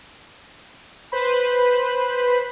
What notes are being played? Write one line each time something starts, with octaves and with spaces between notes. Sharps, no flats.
B4 C5 B5